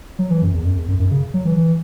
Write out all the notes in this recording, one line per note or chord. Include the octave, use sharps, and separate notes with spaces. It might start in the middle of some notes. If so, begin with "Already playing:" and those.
F#3
E3
F#2
E2
F#2
E2
F#2
F#2
C#3
F#3
E3
E3